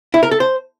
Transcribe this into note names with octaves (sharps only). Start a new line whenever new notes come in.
E4
A#4
A4
C5